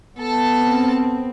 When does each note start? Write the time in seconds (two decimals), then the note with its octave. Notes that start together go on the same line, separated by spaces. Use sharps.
0.18 B3 A4 A5
0.61 C4